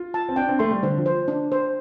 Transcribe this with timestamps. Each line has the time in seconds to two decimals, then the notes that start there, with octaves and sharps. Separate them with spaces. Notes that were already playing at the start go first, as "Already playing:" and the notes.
Already playing: F4
0.14 A5
0.29 C4
0.36 D4 G5
0.49 C4
0.59 A3 C6
0.71 G3
0.83 D3 C5
0.98 F3
1.06 C5
1.28 D4
1.52 C5